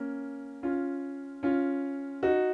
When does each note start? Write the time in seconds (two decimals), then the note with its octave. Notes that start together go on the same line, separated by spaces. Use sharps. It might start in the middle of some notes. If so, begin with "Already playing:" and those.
Already playing: A#3 C#4
0.63 C#4 F4
1.43 C#4 F4
2.23 D#4 F#4